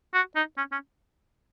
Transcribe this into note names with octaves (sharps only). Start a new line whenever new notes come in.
F#4
D#4
C#4
C#4